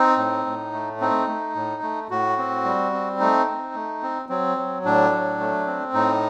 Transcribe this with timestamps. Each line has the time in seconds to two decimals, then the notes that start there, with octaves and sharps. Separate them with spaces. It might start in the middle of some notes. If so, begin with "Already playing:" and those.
Already playing: C4 D#4
0.18 A2
0.46 A2
0.73 A3
1.00 C4 D#4
1.28 A3
1.55 A2
1.82 A3
2.10 A2 F#4
2.38 C4
2.65 G3
2.92 C4
3.20 A3 D#4
3.47 C4
3.74 A3
4.03 C4
4.29 F#3 C4
4.58 F#3
4.85 A2 D4
5.12 F#3
5.40 A3
5.67 C4
5.94 A2 D#4